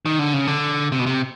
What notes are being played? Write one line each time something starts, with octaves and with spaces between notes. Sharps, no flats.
D#3
D3
C#3
D3
C3
B2
C3